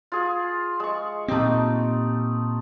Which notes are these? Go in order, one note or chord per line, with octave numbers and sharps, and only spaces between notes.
F4 G#4
G#3 C#6
A#2 A3 C4 D#4 G4